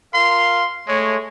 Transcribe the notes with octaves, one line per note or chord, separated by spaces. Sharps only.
F4 A#4 F5 C6
G#3 A3 C#5